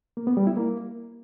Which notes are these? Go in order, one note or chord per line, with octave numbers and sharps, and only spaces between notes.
A#3
B3
G3
E4
A#3